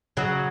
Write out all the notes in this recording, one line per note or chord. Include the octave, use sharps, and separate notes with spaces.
C#3 F#3